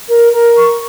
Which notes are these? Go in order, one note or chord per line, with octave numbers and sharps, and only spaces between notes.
A#4
A#4
C#6